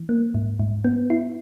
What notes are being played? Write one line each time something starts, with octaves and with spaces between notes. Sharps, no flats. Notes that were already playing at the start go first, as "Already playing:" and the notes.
Already playing: E3
A#3
G#2
G#2
B3
E4